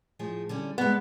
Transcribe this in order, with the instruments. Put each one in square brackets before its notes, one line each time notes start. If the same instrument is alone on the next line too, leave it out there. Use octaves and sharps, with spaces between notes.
[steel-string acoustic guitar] A2 F3 G#4
D3 G3 C#4
[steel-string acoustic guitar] G2 G#3 [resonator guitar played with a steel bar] B3